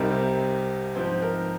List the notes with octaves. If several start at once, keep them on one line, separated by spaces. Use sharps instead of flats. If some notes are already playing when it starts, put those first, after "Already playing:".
Already playing: C2 C3 G3 C4 D#4 A#4
G#2 F3 C4 C5
A#4